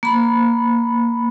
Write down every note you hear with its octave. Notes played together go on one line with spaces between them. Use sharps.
A#3 B5